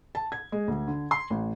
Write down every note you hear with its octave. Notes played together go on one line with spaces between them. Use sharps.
A5
G#6
G#3
D2
D3
C6
A1